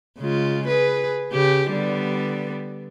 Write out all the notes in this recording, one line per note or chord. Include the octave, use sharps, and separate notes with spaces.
C#3 G#3 F4
G#4 B4
C#3 G4
D3 G3 B3